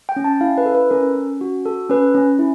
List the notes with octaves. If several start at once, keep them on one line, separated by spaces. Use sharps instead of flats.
G5
C#4
A5
E4 F5
B4
A4
B4
C#4 A#4
C#4
F#4
A4
C#4 B4
C#4
E4